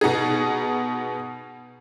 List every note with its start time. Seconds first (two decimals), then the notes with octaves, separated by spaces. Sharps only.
0.01 B2 B3 D#4 G#4